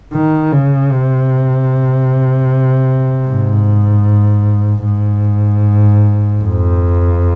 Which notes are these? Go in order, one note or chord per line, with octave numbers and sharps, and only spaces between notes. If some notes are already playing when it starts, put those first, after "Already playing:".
D#3
C#3
C3
G#2
G#2
F2